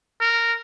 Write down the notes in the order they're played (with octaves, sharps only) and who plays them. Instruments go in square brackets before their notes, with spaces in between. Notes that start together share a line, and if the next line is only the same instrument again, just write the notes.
[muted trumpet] A#4